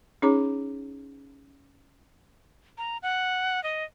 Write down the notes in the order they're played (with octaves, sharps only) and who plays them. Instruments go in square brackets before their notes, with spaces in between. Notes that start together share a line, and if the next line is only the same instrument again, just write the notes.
[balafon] C#4 D#4 G#4 C#5 A#5 D6
[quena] A#5
F#5
D#5